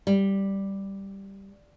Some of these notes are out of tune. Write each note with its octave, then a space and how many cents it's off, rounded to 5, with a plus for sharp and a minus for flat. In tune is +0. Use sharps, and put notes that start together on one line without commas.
G3 +0